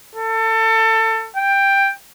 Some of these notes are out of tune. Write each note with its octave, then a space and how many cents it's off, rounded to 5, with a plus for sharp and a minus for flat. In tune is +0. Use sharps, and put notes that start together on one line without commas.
A4 +25
G5 +10